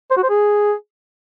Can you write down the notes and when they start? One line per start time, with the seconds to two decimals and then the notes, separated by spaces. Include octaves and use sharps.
0.11 C5
0.17 F#4
0.23 C5
0.30 G#4